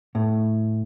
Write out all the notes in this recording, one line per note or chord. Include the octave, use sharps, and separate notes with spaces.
A2